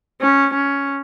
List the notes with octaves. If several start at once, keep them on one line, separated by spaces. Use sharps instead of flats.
C#4
C#4